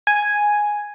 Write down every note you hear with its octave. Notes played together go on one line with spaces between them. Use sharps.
G#5